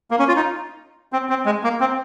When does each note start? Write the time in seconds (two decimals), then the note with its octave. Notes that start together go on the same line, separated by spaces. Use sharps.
0.11 A#3
0.19 C#4
0.28 F4
0.36 D#4
1.13 C4
1.30 C4
1.46 G#3
1.64 A#3
1.80 C4